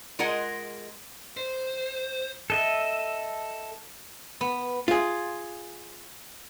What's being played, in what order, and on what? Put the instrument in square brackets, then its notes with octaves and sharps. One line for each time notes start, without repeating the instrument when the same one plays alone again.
[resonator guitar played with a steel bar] G#3 F4 G#4 A#4 D#5 F#5
[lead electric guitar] C5
[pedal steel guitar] A4 D#5 E5
[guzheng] B3
[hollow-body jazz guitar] F4 G#4